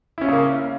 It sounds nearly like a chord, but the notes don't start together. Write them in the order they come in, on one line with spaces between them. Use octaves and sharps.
E4 C#4 F4 C#3 A#3